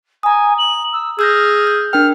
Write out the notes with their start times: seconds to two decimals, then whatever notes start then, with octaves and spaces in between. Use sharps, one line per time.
0.23 G#5 A#5 D#6
0.58 F#7
0.93 E6
1.19 G#4 E6 F6 G6 A#6
1.67 G6
1.93 D4 A#4 G5 F6